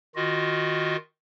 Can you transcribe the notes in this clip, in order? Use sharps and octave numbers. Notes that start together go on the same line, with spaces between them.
D#3 F4 F#4 D#5